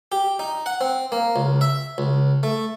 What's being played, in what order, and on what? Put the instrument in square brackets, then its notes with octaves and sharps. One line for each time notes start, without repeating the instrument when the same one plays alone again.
[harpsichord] G4
D#4
F#5
C4
A#3
C#2
E5
C#2
A3